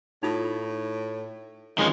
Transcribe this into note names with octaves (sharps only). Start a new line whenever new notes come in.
A2 D#4 F4 D#6
D#3 F3 G#3 C#4